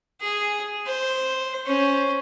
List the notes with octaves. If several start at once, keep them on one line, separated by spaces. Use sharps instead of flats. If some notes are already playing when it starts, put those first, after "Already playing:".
G#4
C5
C#4 C5